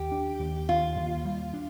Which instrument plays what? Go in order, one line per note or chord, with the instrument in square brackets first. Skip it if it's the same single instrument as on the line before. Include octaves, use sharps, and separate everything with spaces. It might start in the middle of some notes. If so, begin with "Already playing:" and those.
Already playing: [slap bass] D#2 [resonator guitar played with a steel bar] G4
[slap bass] D4
D#2
[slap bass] D#2 [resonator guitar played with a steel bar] F4
[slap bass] D#2
G3
D4